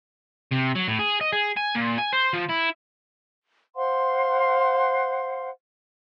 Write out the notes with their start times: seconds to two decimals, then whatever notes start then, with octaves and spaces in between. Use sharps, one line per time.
0.52 C3
0.76 F#3
0.88 A2
0.99 G#4
1.21 D#5
1.33 G#4
1.57 G#5
1.75 A#2
1.98 G#5
2.13 C5
2.33 F3
2.49 E4
3.76 C5 F5 F#5 C6